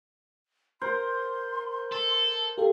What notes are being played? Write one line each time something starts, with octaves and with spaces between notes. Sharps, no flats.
A#4 C5 C6
A4
G4 A4 F5